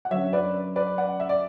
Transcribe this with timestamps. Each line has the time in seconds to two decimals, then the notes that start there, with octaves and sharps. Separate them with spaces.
0.05 F#5
0.11 F#2 D3 F#3 C#5 E5
0.33 B4 D5
0.76 B4 D5
0.98 D5 F#5
1.20 E5
1.29 D5